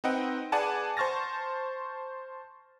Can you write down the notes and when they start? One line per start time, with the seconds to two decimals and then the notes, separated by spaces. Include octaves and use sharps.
0.04 C4 D#4 B4 D#5 F#5 G5
0.52 G#4 B4 D5 F#5 G#5 A5
0.97 C5 A5 C#6 F6 A6 A#6